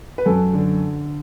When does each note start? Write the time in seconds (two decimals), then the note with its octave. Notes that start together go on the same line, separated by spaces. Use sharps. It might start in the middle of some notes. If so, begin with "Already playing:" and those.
0.18 B4
0.26 F#2 A4
0.54 D3